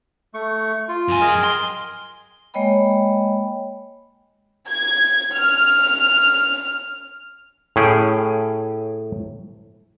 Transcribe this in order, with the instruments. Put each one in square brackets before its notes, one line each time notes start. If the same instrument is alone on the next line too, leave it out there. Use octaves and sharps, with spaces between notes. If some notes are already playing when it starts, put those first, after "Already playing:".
[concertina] A3 C#6
F4
[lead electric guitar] F#2 G#5
[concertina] G#4 A#4 D#5
[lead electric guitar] C6
[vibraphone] G#3 A#3 C#5 D#5 G5 B5
[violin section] G#6
F6
[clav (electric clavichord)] A2 C#4 G#4 G5